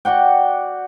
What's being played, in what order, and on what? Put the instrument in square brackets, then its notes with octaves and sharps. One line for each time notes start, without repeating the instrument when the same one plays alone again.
[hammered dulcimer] F#4 D5 F#5 G5